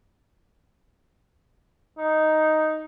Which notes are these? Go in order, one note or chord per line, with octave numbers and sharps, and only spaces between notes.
D#4